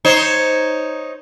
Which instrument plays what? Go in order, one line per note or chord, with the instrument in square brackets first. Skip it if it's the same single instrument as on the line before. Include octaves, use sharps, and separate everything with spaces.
[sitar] D#4 C5 C#5